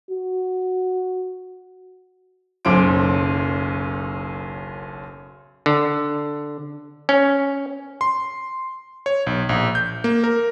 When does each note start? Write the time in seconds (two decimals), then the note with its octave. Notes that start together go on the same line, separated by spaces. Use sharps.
0.11 F#4
2.65 F#1 B1 F#2 C5 D6 D7
5.66 D3
7.09 C#4
8.01 C6
9.06 C#5
9.27 B1
9.49 A#1
9.75 G6
10.04 A#3
10.24 A#4